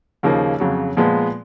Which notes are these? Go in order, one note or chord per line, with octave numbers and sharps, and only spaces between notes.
D#2 C#3 F3 A#3 D#4
F2 C#3 F#3
A#2 F3 G#3 B3